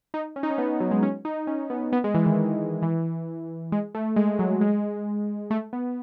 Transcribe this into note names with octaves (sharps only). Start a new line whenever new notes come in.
D#4
C#4
D#4
C#4
B3
F#3
G#3
C#4
D#4
C#4
B3
B3
G#3
E3
D#3
E3
G#3
A3
G#3
F#3
G#3
A3
B3